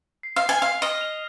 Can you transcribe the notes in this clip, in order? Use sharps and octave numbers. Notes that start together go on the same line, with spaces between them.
C7
F5
C7
G#5
F5 F7
D#5 F6
F7